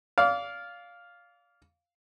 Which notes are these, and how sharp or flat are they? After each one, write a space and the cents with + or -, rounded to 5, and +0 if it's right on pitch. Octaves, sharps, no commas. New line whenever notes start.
D5 -30 F5 +0